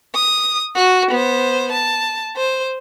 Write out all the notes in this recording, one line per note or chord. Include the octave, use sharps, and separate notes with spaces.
D#6
F#4
B3 C5
A5
C5